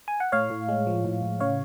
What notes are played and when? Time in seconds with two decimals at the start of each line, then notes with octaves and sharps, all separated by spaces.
0.08 G#5
0.20 F#5
0.32 A2 C#5 F5
0.50 A2
0.69 G#3
0.87 F3
1.05 A2
1.23 A2
1.40 C#3 C#5 F5